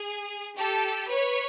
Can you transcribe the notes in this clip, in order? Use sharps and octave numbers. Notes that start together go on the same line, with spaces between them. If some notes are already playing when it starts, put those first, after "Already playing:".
Already playing: G#4
G4 A4
B4 C#5